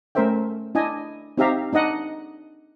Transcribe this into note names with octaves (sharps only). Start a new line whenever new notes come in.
A3 C#4 A#4 C5 E5 G5
D4 E4 D#5 G#5
C4 D#4 G4 E5 F5 A#5
D4 D#4 D#5 F#5